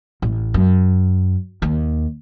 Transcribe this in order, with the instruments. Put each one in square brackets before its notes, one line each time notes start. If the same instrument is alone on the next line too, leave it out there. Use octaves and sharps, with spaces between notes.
[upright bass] A1
F#2
D#2